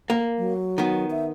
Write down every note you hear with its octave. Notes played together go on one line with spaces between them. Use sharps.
A#3
F#3
D#3 B3
E5